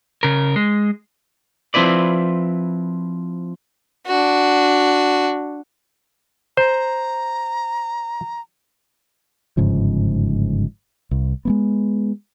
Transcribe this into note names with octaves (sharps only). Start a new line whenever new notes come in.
C#3 A#4
G#3
F3 C4 E4 B4 D5
D4 F#4
C5 A#5
G1 G#2 C#3 F3
C2
G#3 A3 B3